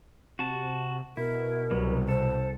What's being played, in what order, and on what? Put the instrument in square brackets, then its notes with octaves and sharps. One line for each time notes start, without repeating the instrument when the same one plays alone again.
[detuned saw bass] C3 [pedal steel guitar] F#4 A5
[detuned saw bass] B2 [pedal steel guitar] E4 [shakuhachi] A#4
[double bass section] C2 [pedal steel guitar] F#3 G3 B3
[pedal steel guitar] A4 [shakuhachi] C5